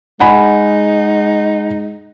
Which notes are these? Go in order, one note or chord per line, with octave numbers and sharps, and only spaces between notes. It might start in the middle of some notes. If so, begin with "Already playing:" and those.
G#3 D#4 F#5 G#5 B5